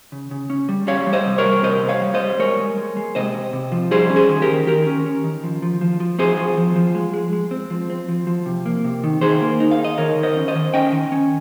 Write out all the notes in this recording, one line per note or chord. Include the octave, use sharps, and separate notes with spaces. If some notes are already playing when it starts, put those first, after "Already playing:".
C#3
C#3
C#4
G3
G3 C#5 F5
G3
C5 D#5
C3
A#4 C#5
G3
C3 C5 D#5
C3
C#5 F5
G3
C5 D#5
G3
G#3 A#4 C#5
G#3
G#3
G#3
C3 C5 D#5
C3
C3
F3
G3 G#4 C5
C#4
G#4 C5
D#3
G4 A#4
D#3
D#3 G4 A#4
C#4
C#4
D#3
F3
F3
F3
F3
C4 G#4 C5
F3
F3
F3
G#3
G#3
G#3
C4
F3
C4
F3
F3
C3
A#3
C3
D#3
D#3 G#4 C5
A#3
D#4
F5
D#4
D#5
D#3 A#4 C#5
D#3
C5 D#5
C#4
C5 D#5
D#3
C#4 D#5 G5
D#3
C#4